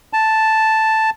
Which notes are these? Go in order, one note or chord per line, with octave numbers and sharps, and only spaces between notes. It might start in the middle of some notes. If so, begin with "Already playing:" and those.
A5